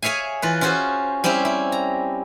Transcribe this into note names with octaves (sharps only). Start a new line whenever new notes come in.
G#4 C#5 E5 F5 G#5
E3 F4 B4
C#4 F4 F#4 G#4 C5
G3 C4 C#4 E4 G4
E4
A#5